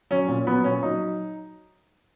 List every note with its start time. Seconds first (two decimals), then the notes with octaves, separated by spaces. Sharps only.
0.11 F#3 C#4
0.28 A#2
0.47 F#3 B3
0.64 A#2 C#4
0.83 F#3 D#4